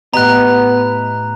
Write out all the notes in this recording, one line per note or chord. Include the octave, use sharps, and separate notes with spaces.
A2 B3 G4 D#5 A#5 F#6